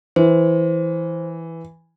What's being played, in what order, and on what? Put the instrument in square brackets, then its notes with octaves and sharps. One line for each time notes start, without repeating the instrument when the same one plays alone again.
[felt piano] E3 [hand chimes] C5